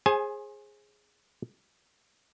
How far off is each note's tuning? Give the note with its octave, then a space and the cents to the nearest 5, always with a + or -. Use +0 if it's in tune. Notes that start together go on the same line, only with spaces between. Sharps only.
G#4 +0 C5 +35 G#5 +20